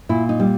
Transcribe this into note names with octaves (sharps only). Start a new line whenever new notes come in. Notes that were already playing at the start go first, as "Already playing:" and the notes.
A#2 E4
D#4
G3